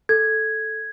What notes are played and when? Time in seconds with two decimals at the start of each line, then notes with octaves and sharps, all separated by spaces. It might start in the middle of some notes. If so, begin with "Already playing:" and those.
0.09 A4 G#6